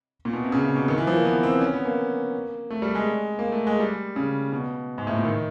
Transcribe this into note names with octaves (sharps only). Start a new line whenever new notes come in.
A#2
B2
C3
C#3
C3
B2
D#3
E3
F3
A#3
B3
C4
C#4
B3
A#3
A3
G3
G#3
A#3
A3
G#3
G3
C#3
B2
G#2
A2
A#2
D#3